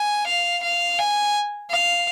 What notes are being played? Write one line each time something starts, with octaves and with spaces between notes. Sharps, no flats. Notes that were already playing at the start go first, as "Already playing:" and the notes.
Already playing: G#5
F5
F5
G#5
F5